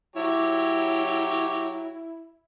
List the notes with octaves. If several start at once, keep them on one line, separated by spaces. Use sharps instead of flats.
F#3 E4 G4 C#5